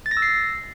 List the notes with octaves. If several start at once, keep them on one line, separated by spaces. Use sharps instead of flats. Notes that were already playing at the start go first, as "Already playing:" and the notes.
A6
A#6
E6
C7